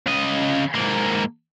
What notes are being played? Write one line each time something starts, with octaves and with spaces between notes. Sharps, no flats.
C#3 D#5
G#2 A#3